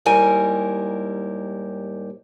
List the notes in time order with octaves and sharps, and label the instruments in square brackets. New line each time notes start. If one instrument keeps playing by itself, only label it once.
[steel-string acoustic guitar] D#2 G#2 G3 E4 A#4 G#5